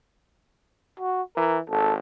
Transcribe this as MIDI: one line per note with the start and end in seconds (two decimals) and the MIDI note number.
1.00 1.22 66
1.37 1.59 52
1.37 1.57 70
1.70 1.99 32
1.70 1.93 69